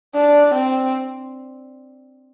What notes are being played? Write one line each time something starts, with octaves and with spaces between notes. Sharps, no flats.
D4
C4